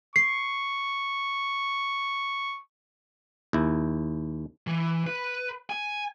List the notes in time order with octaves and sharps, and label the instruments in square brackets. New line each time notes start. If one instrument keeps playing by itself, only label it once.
[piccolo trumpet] C#6 [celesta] C7
[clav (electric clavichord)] D#2 E4
[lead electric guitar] E3
B4
G#5